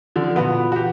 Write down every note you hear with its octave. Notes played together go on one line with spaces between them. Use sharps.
D3 F3
A#2 E3 B3 F4 F#4 B4
F#4 G4